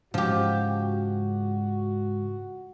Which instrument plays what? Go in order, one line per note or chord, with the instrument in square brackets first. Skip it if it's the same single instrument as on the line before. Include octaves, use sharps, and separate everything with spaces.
[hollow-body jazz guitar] G#2 C#3 [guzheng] F3 G4 [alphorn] F#4